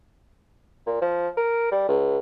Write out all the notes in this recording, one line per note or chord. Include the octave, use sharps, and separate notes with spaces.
A#2
F3
A#4
G3
C#2